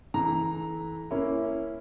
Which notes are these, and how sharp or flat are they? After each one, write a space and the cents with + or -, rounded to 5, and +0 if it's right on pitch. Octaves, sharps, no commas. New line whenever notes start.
E3 -25 A4 -35 A#5 +0
A#3 +0 C#4 +0 E4 +5